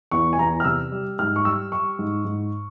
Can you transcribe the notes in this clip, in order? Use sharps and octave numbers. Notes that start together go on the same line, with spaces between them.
E2 C#6
G#5
E2 A#5
F6
C3 E6
G3
G#2 F6
C#6
G3 E6
G3 C#6
G#2
G#2